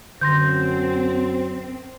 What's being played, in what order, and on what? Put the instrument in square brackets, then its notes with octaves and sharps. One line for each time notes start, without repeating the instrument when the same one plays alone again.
[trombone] F#2 [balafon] D3 C6 [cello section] C4 [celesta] G6 A#6